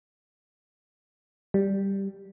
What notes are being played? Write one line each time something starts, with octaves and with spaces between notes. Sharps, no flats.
G3